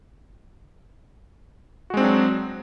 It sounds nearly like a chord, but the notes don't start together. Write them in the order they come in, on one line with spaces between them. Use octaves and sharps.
F#4 G#3 C4 D4 F#3